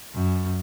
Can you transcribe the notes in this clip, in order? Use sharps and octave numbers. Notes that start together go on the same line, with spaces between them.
F#2